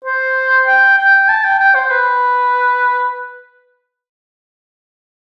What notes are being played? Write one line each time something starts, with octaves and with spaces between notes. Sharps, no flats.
C5
G5
G5
A5
G5
G5
C5
B4